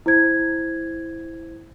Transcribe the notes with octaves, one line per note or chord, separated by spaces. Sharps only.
E4 C5 G#6